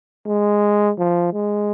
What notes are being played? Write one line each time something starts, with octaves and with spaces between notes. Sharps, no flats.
G#3
F3
G#3